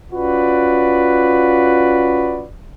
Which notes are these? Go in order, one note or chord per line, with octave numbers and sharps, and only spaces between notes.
C#4 F4 F#4 B4 D5